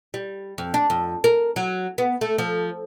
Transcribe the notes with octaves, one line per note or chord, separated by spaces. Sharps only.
G3
F2
D4
F2
A#4
F#3
B3
A3
F3